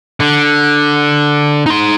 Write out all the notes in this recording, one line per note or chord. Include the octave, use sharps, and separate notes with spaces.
D3
D#4 C6